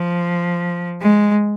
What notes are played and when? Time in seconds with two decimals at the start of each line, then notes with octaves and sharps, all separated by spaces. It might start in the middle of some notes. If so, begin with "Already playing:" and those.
Already playing: F3
1.01 G#3